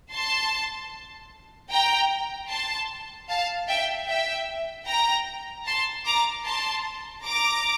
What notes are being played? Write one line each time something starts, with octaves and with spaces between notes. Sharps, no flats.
A5 C6
G5 A#5
A5 C6
F5 A5
E5 G5
E5 G5
G5 A#5
A5 C6
A#5 D6
A5 C6
A#5 D6